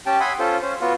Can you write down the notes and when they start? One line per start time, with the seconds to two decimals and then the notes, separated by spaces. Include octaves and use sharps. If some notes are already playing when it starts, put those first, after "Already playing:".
0.06 C#4 G4 G5 A5
0.20 E5 F#5 G#5 B5 C6 D#6
0.39 C#4 F4 A4 C5
0.62 C#4 C5
0.81 B3 F4 F#4